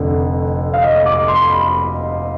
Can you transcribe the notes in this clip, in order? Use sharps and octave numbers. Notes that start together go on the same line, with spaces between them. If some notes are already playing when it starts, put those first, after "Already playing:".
Already playing: F1 F2 D3
F5
D#5
D6
C6
B5